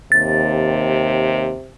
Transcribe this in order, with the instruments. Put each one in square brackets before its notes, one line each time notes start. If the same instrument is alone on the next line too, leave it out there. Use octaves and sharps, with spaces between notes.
[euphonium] D#2 [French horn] C3 [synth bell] A6